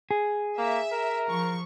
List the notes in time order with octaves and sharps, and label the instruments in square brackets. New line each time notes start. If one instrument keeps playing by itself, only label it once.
[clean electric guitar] G#4
[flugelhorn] A#3 [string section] E5
[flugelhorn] A#4
[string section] F3 C#6